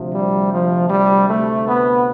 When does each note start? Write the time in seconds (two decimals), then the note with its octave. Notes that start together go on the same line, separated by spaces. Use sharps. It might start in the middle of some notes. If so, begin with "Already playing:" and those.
Already playing: D2 C3 F3
0.14 G3
0.52 F3
0.90 G3
1.29 A3
1.67 B3